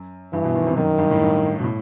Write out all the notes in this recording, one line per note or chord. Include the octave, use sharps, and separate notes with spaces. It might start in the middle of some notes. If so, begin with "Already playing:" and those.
Already playing: F#2
G2 E3
B2
D#3
C3
F#2 D#3
G2
A2
G2
B2
A2